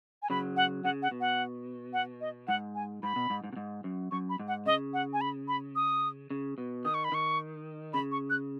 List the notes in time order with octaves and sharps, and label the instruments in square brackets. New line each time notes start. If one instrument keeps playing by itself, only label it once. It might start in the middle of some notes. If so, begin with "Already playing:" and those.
[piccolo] G#5
[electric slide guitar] C#3 F#3 [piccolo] B5
[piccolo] F#5
[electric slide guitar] C#3 [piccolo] F#5
[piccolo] F#5
[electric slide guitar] B2
[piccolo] F#5
F#5
D#5
[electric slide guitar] G#2 [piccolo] F#5
[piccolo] G#5
[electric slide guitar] G#2 [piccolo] B5
[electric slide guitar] B2
G#2
G#2
B2
G#2
F#2
[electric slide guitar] F#2 [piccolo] C#6
[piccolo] B5
[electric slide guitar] G#2
[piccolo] F#5
[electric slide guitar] C#3 [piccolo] D#5
[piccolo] F#5
G#5
B5
B5
D#6
[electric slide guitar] C#3
B2
[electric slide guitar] D#3 [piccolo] D#6
[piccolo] C#6
B5
[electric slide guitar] D#3 [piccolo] C#6
[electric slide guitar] C#3 [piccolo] B5
[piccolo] C#6
F#6